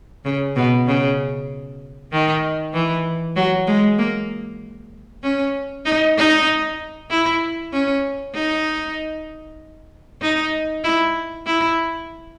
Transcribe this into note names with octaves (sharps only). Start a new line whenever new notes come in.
C#3
B2
C#3
D#3
E3
F#3
G#3
A#3
C#4
D#4
D#4
E4
C#4
D#4
D#4
E4
E4